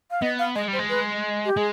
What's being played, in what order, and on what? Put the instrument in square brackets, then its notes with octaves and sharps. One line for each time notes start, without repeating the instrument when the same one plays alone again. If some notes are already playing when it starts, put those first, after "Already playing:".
[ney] F5
[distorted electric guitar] B3 [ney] D#5
[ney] F5
[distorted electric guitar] G#3 [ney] D#5
[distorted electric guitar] G3
[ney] C5
[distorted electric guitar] G#3
[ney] B4
G4
[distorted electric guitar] G#3 [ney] G#4